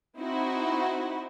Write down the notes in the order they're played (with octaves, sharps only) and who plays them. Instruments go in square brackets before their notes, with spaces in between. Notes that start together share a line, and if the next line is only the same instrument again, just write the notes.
[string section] C4 D#4 E4 F#4